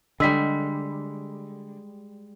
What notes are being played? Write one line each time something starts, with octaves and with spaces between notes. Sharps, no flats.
D3 G3 G#3 E6 B6